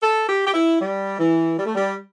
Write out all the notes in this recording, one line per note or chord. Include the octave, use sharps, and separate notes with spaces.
A4
G4
G4
E4
G3
E3
G3
A3
G3